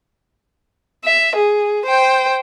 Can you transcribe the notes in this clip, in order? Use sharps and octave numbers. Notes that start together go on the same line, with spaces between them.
E5
G#4
C5 G5